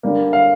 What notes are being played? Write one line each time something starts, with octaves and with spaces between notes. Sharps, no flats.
D3 G3 A#3
F5